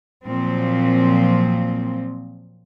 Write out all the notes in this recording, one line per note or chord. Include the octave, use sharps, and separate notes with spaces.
A#2 F3 F#3 C4